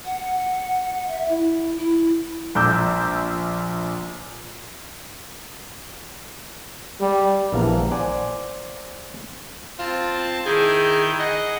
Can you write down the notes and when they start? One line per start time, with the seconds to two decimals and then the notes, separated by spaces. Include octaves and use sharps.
0.05 F#5
1.08 E5
1.29 E4
1.77 E4
2.55 A#1 A#5 D6 E6 G6
7.00 G3
7.52 A#1 E3 B3 F5 A5 A#5
7.91 C5 D5 F#5 G#5
9.79 C4 F4 A5
10.46 D#3 E4 G#4 G6
11.19 G#4 D#5 F#5